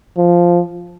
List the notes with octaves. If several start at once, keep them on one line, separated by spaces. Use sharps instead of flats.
F3